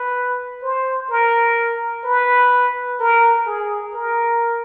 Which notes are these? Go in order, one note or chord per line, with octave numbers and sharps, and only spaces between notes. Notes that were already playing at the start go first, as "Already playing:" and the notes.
Already playing: B4
C5
A#4
B4
A#4
G#4
A#4